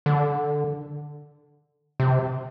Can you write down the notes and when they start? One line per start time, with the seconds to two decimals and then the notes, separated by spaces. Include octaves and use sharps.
0.06 D3
2.00 C3